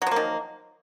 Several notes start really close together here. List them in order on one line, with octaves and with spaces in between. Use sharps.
F#3 F3 A#3 D#3